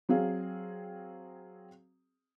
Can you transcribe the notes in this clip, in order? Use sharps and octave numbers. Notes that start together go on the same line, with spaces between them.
F#3 C4 G#4 F5